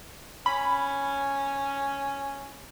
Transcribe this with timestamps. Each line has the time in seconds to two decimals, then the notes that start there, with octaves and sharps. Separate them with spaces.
0.46 C#4 B5